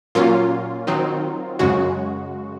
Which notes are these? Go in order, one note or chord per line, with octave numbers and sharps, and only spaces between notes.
A#2 F#3 A#3 C#4 F4
D#3 F#3 C4 D#4
F#2 C#3 G#3 F#4